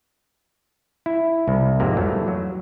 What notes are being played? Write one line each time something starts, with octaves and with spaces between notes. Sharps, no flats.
E4
C2
F2 G#2 C3 A#3
E3 F#3 A3
F#3